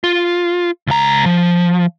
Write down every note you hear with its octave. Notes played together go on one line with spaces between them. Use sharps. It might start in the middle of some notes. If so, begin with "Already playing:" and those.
F4
C#2 A#5
F3